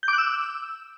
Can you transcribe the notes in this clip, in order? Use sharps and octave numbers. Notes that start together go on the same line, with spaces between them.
G6
D6
F#6
E6